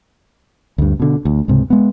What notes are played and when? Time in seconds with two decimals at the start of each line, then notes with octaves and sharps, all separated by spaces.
0.78 D2 G2
1.00 B2 D3
1.25 D2
1.48 C#2 G#2 C3
1.70 G#3 B3